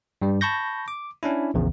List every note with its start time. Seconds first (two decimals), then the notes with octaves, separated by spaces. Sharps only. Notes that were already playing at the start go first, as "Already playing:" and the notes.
0.22 G2 G3
0.41 A5 B5 C#6 G6 A#6
0.88 D6
1.23 C#4 D4 E4
1.54 A#1 E2 C#3